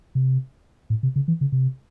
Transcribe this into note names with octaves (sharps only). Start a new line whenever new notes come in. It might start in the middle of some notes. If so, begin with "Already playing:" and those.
C3
A2
C3
C#3
E3
C#3
C3